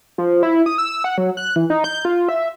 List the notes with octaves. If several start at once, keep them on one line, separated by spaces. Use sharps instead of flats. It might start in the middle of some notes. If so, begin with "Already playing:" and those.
F3
E4
D#6
E6
F#5
F#3
F#6
E3
D#4
G6
F4
E5